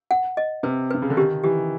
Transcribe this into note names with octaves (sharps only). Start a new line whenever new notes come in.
F#5
D#5
C3 B4
C3 B4
C#3
D3
D#3 G4
E3 G4